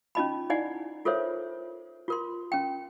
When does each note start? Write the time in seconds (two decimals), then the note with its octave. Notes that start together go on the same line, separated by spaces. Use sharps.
0.15 C#4 D#4 F4 D#5 A5 B5
0.50 D#4 E4 D5 D#5 F#5 G#5
1.05 F4 A4 A#4 C5 C#5 E5
2.08 F4 A#4 C6
2.52 C#4 G5